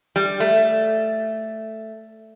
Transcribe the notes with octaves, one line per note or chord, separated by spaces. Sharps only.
G3
A3